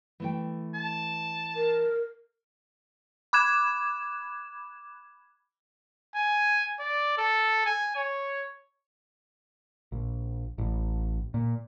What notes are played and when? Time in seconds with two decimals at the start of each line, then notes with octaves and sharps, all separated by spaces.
0.20 E3 A3 G5
0.74 A5
1.55 A#4
3.33 B5 D6 F#6 G#6 E7
6.15 G#5
6.80 D5
7.18 A4
7.66 G#5
7.96 C#5
9.92 A#1
10.58 A1
11.34 A#2